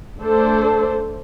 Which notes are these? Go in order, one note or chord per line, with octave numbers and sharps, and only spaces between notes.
A3 D4 A4 C5